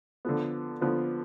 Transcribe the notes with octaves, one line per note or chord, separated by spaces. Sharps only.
D3 F3 B3
D3 F3 B3